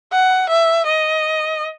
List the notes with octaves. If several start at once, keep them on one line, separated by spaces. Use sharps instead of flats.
F#5
E5
D#5